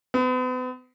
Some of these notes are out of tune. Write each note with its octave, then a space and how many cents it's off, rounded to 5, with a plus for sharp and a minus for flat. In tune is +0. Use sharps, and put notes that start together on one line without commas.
B3 +40